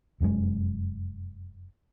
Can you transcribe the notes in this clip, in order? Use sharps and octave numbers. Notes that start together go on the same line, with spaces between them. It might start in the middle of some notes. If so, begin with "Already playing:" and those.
F1 F#2 A2 G#3